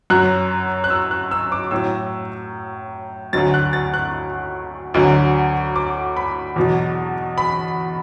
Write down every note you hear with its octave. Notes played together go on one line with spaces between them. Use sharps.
F#2 F#3 F#6
F#6
E6
F#6
E6
D6
A2 F#3 E6
D2 D3 F#3 A6
F#6
A6
F#6
D2 D3 F#3
D6
B5
E2 B2 F#3
B5